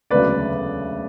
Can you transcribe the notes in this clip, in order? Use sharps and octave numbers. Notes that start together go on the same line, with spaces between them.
E1 D2 C#3 F#3 B4 D5